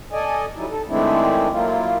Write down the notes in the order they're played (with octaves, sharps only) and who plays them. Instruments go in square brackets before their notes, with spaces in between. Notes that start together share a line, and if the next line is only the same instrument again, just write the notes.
[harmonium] A4 D5 D#5 G#5
F#3 G3 D#4 E4
A4
D#3 G#3 A3 C4 D4 E4
F#3 A#3 E4 F4